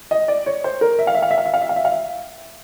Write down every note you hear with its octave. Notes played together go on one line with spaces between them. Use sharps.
D#5
D5
C#5
C5
A#4
E5
F5
E5
F5
E5
F5
E5
F5
E5
F5
E5
F5
E5